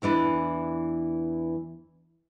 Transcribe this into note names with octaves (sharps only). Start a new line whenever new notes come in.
E2 E3 D4 B4